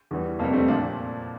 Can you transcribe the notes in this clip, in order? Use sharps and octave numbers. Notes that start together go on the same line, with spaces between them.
E2 E3 G3
F2 C3 G3 A#3
A3 C4
A#2 F3 A#3 D4